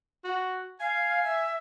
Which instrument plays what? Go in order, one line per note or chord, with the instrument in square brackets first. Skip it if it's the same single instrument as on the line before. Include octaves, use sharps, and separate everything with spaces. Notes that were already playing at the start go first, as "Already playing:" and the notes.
[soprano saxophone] F#4
[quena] F5 [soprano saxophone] G#5
[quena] E5